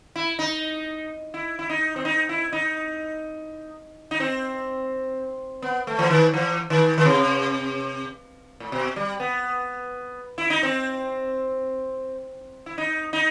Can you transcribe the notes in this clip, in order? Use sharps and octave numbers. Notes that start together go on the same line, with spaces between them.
E4
D#4
E4
E4
D#4
C4
D#4
E4
D#4
D#4
C4
B3
A3
E3
D#3
E3
D#3
D#3
C3
A2
B2
G3
B3
E4
D#4
C4
E4
D#4
D#4